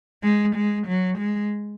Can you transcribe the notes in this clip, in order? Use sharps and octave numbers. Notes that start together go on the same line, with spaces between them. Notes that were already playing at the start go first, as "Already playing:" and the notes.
G#3
G#3
F#3
G#3